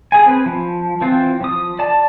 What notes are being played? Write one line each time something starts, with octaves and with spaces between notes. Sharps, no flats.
G#4 G#5
C4 B4
F3
E3 C4 F4
F3 D#6
D5 A5